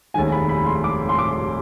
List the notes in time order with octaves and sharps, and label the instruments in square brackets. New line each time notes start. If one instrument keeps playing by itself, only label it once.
[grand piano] F1 D#2 D#3 G#3 [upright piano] G#5
[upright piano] B5
B5
C6
D6
C6
D6